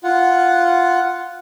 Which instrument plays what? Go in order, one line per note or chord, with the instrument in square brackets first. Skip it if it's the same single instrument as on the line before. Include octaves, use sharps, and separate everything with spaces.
[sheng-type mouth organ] F4 F#5